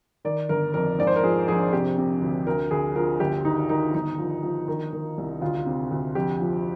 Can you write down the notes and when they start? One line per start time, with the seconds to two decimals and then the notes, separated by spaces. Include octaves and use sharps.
0.25 D#3 D5
0.49 G1 A#4
0.74 F2 A#4
0.99 G#2 D5
1.07 C5
1.16 A#4
1.23 F3 G#4
1.48 A#1 G#4
1.73 C3 G4
1.98 C3
2.22 D2
2.47 D2 A#4
2.71 D2 G#4
2.95 F3 A#4
3.20 G1 G4
3.45 D#3 D#4
3.69 D#3 D#4
3.94 G1 D#4
4.19 F3
4.43 F3
4.68 D#3
4.93 D#3
5.18 C2
5.41 D2 F4
5.66 C3
5.91 D2
6.15 F2 G4
6.40 F3